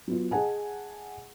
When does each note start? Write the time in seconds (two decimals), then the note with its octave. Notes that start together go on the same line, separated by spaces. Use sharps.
0.08 F#3 B3 F4
0.31 G#4 D#5 F#5 G#5 A5